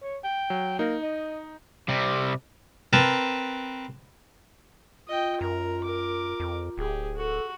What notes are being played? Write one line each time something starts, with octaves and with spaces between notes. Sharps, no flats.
C#5
G5
F#3
A#3 D#4
D#5
C3 G3
C4 A#4 B4 A5
F4 D#5 G5
F#2 A#4 A#5
A#4 D6
F2
D1 G4 G#4
F#4 A4